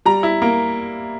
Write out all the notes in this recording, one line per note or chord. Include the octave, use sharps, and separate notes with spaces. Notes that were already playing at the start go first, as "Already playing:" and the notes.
G3 A#5
E4
A#3